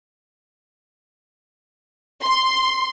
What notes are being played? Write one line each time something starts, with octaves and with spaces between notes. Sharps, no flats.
C6